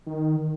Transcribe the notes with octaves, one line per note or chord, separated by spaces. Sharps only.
D#3